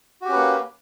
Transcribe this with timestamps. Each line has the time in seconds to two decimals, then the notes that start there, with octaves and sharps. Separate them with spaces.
0.21 F#4
0.25 G4
0.29 C#4
0.32 B4
0.36 A#3